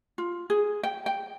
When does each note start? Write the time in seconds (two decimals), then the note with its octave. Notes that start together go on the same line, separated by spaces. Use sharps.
0.18 F4
0.50 G#4
0.83 G5
1.06 G5